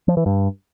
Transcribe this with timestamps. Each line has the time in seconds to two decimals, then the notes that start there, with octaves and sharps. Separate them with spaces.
0.08 F3
0.17 E3
0.26 G2